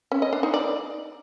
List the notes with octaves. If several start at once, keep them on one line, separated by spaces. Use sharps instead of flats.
C#4
D#5
D4
D#4
D5